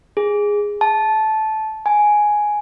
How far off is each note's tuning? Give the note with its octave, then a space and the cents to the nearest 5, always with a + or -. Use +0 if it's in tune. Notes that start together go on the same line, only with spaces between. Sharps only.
G#4 -10
A5 -15
G#5 +5